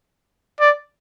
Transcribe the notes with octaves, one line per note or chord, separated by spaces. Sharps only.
D5